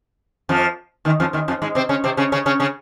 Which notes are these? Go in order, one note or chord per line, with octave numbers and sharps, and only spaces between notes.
F2 F3
D#2 D#3
F2 F3
D#2 D#3
F2 F3
G#2 G#3
C3 C4
C#3 C#4
C3 C4
C#3 C#4
C#3 C#4
C#3 C#4
C#3 C#4